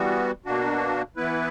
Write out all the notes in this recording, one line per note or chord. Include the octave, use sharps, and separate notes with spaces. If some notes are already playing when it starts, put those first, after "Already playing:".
Already playing: E3 G3 B3 F#4
B2 A#3 D4 F#4
E3 B3 E4 B4